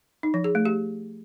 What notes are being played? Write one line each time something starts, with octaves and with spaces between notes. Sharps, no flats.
D#4
F3
G#4
A3
G4